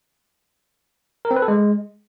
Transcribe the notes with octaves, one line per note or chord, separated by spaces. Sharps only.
A#4
C4
B4
A4
G#3